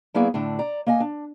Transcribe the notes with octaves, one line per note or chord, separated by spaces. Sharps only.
F#3 A#3 B3 E4 G#4 D5
A2 D3 D4
D5 A#5
A#3 D#5 G#5
D4